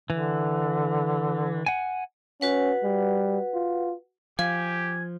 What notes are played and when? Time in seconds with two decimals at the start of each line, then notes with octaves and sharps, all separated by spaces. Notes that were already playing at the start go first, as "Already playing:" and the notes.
0.10 D3 E3
1.66 F#5 G#5
2.41 C#4 F#4 B4 F#5
2.84 G3
3.54 F4
4.39 F3 G4 F5 G#5